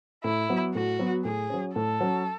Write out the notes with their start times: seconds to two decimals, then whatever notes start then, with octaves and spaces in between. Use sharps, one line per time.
0.24 A2 E4
0.49 F#3 B3
0.74 A2 F#4
0.99 F#3 B3
1.25 A2 G#4
1.50 F#3 C#4
1.75 A2 A4
2.01 F#3 C#4